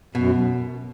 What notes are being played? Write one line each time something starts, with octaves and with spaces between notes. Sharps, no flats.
F#2 B2